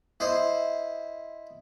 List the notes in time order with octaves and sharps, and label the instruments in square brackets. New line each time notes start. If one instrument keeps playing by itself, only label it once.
[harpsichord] E4 C5 D#5